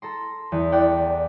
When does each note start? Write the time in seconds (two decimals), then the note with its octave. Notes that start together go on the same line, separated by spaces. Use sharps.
0.02 A4 A#5 C6
0.52 E2
0.72 A4 D5 F#5 G5